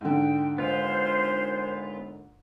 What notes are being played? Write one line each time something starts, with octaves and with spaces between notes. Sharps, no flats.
G#2 D3 G5
D#2 A#2 G#3 B3 F4 C5